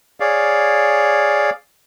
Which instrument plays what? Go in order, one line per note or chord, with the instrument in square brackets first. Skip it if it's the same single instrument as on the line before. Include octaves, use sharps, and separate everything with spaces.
[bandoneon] G#4 C#5 D5 F5